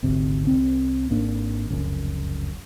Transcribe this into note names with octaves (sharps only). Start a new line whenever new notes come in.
G#1 D2 C3
C2 C4
G#1 A#3 D4
F1 C#2 F#2